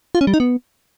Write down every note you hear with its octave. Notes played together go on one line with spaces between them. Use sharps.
F4
C#4
G3
D#4
B3